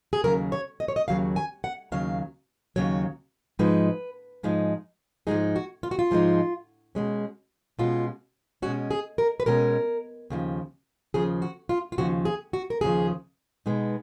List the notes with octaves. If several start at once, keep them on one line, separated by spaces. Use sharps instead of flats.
G#4
D#2 C#3 F#3 A#4
C#5
D#5
C#5
D#5
D#2 C#3 F#3 F5
G#5
F#5
D#2 C#3 F#3 F5
D#2 C#3 F#3 C#5
G#2 F3 G#3 D#4 B4
G#2 F3 G#3 D#4
G#2 F3 G#3 D#4 G#4
F#4
F4
F#4
F4
G#2 F3 G#3 D#4
B2 G#3 C#4
B2 G#3 C#4 F4
B2 G#3 C#4 F#4
G#4
A#4
B4
B2 G#3 C#4 A#4
D#2 C#3 F3
D#2 C#3 F3 G#4
F#4
F4
F4
D#2 C#3 F3 F#4
G#4
F#4
A#4
D#2 C#3 F3 G#4
B2 G#3 B3 D#4